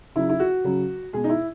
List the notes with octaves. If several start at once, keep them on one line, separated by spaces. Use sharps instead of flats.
C#3 F#3 E4
E4
F#4
C#3 F#3
B2 G#3 G#4
D#4
E4